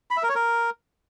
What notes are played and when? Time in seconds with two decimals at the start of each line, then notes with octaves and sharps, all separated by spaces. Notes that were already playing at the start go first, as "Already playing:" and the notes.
0.11 B5
0.17 E5
0.23 A#4
0.29 C#5
0.35 A#4